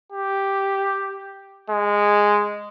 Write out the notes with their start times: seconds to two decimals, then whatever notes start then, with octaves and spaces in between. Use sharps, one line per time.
0.12 G4
1.70 G#3